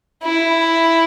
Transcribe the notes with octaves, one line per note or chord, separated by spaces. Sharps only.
E4